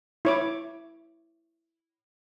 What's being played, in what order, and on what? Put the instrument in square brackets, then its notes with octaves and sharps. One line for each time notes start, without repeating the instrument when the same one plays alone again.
[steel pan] E4 C#5 D6